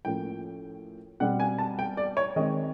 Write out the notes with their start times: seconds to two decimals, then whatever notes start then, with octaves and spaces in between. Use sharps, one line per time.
0.05 A2 F3 A#3 C#4 G5
1.20 B2 G3 C4 F#5
1.40 G#5
1.59 A5
1.79 G5
1.97 D5
2.17 C#5
2.36 D#3 G#3 C4 D#5